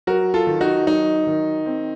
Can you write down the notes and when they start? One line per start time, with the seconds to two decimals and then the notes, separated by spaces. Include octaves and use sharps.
0.07 F#3 F#4 A#4
0.34 F4 A4
0.47 D#3
0.61 D#4 F#4
0.87 F#3 D#4
1.27 D#3
1.66 C4